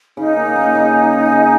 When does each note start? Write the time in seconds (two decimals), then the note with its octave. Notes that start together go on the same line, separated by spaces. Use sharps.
0.17 C#3 D#4
0.36 A#3
0.56 A#3
0.75 C#3
0.94 G#4
1.12 G#4
1.32 C#3